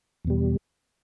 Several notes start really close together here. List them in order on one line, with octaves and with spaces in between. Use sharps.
E2 B2 G3